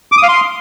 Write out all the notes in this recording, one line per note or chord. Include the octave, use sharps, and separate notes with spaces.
D6
D#6
F5
C6